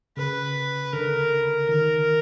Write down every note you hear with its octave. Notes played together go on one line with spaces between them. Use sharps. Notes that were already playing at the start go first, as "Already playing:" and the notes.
C#3 B4
D3 A#4
D#3 A#4